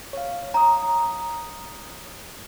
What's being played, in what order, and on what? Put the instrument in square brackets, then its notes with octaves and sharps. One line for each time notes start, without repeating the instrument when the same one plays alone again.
[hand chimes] C#5 F5
[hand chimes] C#5 D#6 [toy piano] A#5